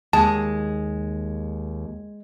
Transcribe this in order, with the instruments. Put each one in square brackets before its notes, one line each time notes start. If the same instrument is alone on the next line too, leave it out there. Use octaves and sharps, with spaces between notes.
[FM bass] D#2 [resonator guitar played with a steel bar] G#3 [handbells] A5